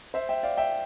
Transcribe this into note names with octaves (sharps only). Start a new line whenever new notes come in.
C5 E5
E5 G5
D5 F5
E5 G5